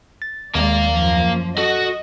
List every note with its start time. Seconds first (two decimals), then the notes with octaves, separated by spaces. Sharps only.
0.22 A6
0.55 D#2 G#3 A#3 D5 F5
0.91 F#2 F3
1.58 F#4 A4 D#5